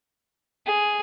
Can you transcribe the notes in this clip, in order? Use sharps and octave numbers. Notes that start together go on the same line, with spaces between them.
G#4